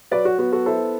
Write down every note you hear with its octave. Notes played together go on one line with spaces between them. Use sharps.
F#3 B4 D5
F#4
B3 F#4
F#4 A4
E4 A4 C5